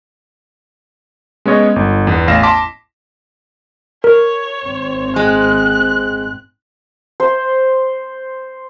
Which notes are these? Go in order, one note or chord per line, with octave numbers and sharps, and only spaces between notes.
G#3 B3 C#4 C#5 D#5
G1
E2 B3
A1 F5 A#6 E7
A5 C6 D6 B6
A#4 C#5
G#1 C4
G#3 F#6
C5